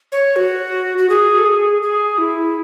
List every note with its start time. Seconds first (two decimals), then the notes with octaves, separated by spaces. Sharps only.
0.12 C#5
0.36 F#4
0.98 F#4
1.09 G#4
1.38 A4
1.45 G#4
1.82 G#4
2.18 E4